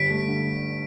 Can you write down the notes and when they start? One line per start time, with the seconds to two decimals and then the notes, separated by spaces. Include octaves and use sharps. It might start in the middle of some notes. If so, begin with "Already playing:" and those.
Already playing: G1 G3 B6 D7
0.10 A3
0.28 D3